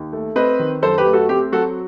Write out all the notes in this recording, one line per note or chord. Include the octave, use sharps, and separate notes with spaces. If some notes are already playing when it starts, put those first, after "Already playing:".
Already playing: D#2
A3
C4 B4 D#5
D#3
F#2 A4 C5
G4 B4
A3
F#4 A4
C4 G4
F#3 F#4 A4